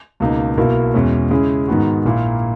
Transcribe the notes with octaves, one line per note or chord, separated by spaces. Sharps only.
C#2 B2 A#3 D#4
B1 B2 A#3 E4 A#4
E2 B2 G#3 C#4
C#3 G#3 C#4 E4 G#4
G#2 D#3 G#3 B3 F#4
A#1 A#2 A#3 E4